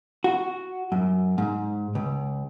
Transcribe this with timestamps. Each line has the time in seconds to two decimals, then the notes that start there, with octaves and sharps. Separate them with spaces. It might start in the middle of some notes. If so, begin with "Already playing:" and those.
0.24 F#4
0.92 F#2
1.38 G#2
1.95 C#2